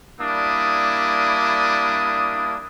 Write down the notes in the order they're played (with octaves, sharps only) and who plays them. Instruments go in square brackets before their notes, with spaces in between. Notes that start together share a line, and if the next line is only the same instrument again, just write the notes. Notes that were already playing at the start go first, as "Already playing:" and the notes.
[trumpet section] G3 A#3 D4 E4 D#6